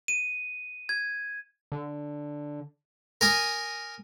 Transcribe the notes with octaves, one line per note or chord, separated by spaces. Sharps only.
D#7
G#6
D3
A#4 G#5 D#6